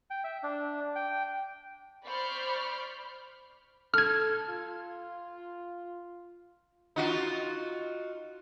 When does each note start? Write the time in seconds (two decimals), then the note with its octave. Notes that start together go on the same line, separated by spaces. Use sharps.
0.10 G5
0.24 E5
0.43 D4
0.95 G5
2.04 C5 D5 B5 C#6 F6 G6
3.94 A4 F6 G#6
4.50 F4
6.96 D#4 F4 F#4